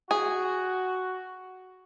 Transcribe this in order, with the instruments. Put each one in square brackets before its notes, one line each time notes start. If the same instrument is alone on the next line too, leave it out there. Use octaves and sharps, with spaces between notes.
[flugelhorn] F#4 [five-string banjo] G#4